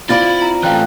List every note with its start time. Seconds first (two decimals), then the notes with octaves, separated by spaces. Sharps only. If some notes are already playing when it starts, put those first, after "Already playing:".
0.09 C4 E4 F4 D5 B5 A6
0.42 A#5
0.63 E3 A3 F5 G5 F#6